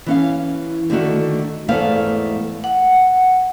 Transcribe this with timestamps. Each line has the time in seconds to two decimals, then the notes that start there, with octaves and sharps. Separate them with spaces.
0.06 E3 C#4 F5
0.90 D3 D#3 A3 F#4 A4
1.68 E2 G#2 A3 B3 B4 F5
2.64 F#5